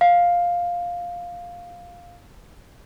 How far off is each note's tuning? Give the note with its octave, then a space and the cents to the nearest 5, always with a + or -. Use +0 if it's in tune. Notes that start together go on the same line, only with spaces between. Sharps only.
F5 +5